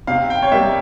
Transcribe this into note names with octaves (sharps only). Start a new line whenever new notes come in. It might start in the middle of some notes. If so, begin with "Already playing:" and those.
C3 F5
G5
C#5
G3 A#3 E5